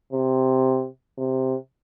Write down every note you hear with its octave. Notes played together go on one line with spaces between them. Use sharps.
C3
C3